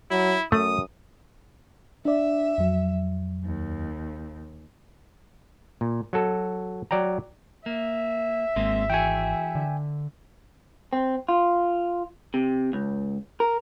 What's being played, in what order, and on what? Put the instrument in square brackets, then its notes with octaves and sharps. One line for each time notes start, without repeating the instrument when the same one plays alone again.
[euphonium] F#3 [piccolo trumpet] E4
[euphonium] F#2 [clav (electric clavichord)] A3 [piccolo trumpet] D#6
[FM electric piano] D4 D5 [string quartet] E5
[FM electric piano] F2 F#3
[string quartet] D#2
[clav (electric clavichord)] A#2
F#3 F#4 A4
F#3 D5 G5 A#5
[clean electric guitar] A#3 [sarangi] E5
[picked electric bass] G#1 [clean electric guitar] G#3 A#3 C4
[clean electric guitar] E3 F#4 G#4 [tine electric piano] G5 G#5
[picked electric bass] D3
[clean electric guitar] C4
F4
C3
C#2
A#4